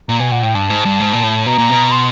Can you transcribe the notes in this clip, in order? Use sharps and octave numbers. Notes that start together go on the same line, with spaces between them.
A#2 A#5
B2 G#5
A#2 F#5
A2 G5
G2 A5
G#2
G2
G#2
A#2
A2
B2 A#5
A#2
B2
C6